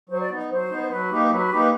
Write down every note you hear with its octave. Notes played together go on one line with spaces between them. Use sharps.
F#3 C5
D5
B3 D#4
F#3 C5
B3 D#4
F#3 B4
A#3 D#4 G4
F#3 B4
A#3 D#4 G4